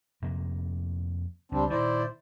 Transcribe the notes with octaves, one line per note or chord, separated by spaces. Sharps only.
F2 C3 A#3
C#2 G3 C4 D4
A#2 D#3 E4 C5 D5